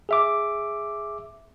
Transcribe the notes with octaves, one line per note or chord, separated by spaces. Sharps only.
G#4 E5 D6